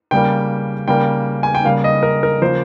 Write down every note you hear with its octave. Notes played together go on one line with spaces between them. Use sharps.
C#3 G3 A#3 G5
C#3 G3 A#3 G5
G#5
G5
C#3 G3 A#3 F5
D#5
A#4
A#4
C#3 F3 A#3 C5